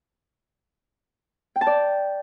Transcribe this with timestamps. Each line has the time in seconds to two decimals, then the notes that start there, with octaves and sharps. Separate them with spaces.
1.56 G5
1.61 A5
1.67 D5